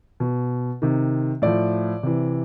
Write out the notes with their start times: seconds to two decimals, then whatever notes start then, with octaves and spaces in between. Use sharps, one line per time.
0.20 B2
0.82 C3 D#3
1.42 A2 F3 D5
2.03 C3 E3